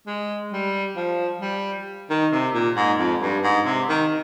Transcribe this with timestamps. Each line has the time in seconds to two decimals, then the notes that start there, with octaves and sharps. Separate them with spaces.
0.07 G#3
0.53 G3
0.96 F3
1.41 G3
2.10 D#3
2.32 C3
2.54 A#2
2.76 G#2
2.99 F2
3.22 G2
3.44 G#2
3.66 C3
3.89 D#3